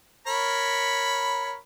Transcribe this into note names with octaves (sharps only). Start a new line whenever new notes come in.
A#4 C#5 B5